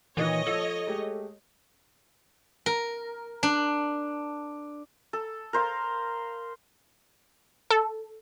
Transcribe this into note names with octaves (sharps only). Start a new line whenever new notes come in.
A#2 D#3 E3 C#5 D#5
F3 A4
G#3 A3 G4
A#4
D4
A4
A#4 C5 F5
A4